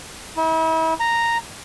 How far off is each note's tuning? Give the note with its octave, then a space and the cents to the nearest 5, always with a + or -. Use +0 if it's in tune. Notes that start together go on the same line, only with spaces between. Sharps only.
E4 -40
A#5 -5